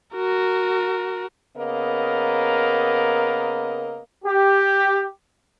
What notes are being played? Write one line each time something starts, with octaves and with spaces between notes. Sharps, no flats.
F#4 A#4
C#3 A#3 B3 A#4 D#5
G4